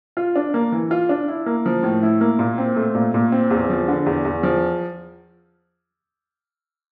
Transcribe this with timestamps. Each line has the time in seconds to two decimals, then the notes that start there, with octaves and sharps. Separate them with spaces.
0.17 F4
0.36 D4
0.54 A#3
0.72 E3
0.91 F4
1.09 D4
1.28 E4
1.46 A#3
1.66 F3
1.83 A2
2.03 E4
2.21 A#3
2.39 A#2
2.58 C4
2.76 A3
2.95 A#2
3.14 A#2
3.32 C4
3.51 E2
3.70 F3
3.88 D3
4.06 E2
4.25 E2
4.43 F3